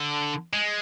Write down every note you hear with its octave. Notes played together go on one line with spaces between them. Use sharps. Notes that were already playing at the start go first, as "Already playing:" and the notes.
Already playing: D3
G#3